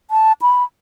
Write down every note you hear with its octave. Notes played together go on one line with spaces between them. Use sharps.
A5
B5